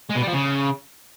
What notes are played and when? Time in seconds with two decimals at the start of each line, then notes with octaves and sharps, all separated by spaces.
0.09 G#3
0.15 B2
0.21 G3
0.27 F3
0.33 C#3